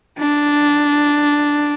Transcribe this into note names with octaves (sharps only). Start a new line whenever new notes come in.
D4